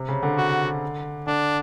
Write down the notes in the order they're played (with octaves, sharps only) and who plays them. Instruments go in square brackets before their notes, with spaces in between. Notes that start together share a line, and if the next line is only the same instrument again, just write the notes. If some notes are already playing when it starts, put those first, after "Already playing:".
Already playing: [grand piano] C3
C#3
D3
[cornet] F#4
[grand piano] D3 [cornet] D4